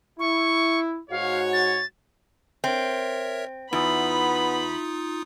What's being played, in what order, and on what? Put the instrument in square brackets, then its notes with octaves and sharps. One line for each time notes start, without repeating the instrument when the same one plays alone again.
[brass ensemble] E4 [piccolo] C#6
[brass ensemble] G#2 F#4 C#5 [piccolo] F5
[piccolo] A6
[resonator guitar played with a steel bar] C4 [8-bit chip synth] A#4 C#5 E5
[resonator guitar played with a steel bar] E2 [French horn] B3 [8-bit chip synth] D#4 F4 D#6 [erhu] B5